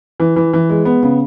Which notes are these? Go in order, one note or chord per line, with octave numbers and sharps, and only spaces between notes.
E3
E3
E3
G#3
B3
C#3